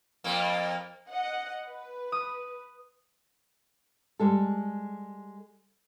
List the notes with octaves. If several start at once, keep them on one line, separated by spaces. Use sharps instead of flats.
F2 A#3
D#5 F#5
B4
D#6
G3 G#3 A4